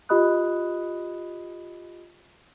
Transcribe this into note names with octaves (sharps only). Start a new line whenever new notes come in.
F4 G4 D#5 B5 D#6 F#6